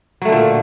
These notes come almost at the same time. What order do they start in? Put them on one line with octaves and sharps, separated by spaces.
F#3 A3 D3 A#2